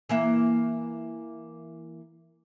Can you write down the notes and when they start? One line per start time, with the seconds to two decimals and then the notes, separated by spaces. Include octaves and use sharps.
0.09 E3 A#3 E5